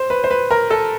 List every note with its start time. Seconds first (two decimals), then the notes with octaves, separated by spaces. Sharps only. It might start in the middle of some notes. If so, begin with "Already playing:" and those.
Already playing: C5
0.10 B4
0.24 C5
0.31 B4
0.51 A#4
0.70 A4